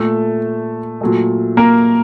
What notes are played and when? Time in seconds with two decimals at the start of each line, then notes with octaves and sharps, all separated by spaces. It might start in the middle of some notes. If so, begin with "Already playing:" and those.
Already playing: A#2 A3 A4
1.01 A#2 F#3 A3
1.57 A#3 A#4